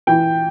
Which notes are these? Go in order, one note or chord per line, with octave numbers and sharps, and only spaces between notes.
E3 G5